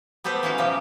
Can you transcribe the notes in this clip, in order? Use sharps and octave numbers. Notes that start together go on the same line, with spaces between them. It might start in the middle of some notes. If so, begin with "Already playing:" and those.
B3 G4 A4 B4 C5
E3 A#3 C#4 E4 F#4 F5
A#2 C#3 F3 G3 A#3 G4